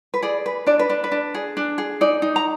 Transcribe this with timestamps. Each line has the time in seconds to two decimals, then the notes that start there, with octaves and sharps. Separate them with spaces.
0.14 B4
0.22 G#4 D5
0.46 B4
0.67 D4 D5
0.79 B4
0.89 D4
1.04 B4
1.12 D4
1.34 G#4
1.57 D4
1.78 G#4
2.01 D#4 D5
2.22 D#4
2.36 A#5